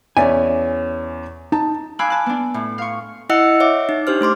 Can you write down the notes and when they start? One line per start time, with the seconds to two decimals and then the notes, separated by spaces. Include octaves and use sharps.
0.17 E2 C#4 D5 E5 G#5
1.52 D#4 A5
1.99 F5 G#5 B5 D6 E6 F#6
2.10 A5 F#6
2.26 B3 D4
2.54 A2
2.78 F5 C#6
3.30 E4 D#5 F#5 E6 C#7
3.60 C#5 E5 D6
3.89 D#4
4.07 D4 G4 C5 F6
4.21 A3 C5 C6 D6